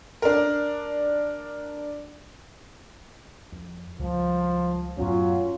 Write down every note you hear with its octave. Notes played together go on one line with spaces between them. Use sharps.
D4 A#4
F2
C#2 F3 G3
F#2 A2 F#3 B3 C#4 F4